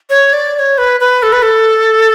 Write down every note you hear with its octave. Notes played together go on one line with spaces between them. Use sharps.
C#5
D5
D5
C#5
B4
B4
A4
B4
A4